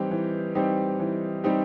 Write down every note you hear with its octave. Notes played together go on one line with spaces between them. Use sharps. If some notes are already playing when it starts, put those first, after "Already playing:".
Already playing: E3 G3 C4 D#4 G4
E3
G3 C4 D#4 G4
E3
G3 C4 D#4 G4